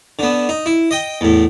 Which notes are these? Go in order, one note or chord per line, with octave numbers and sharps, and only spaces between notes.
D3 B3
D#4
E4
D#5 G5
E2 A2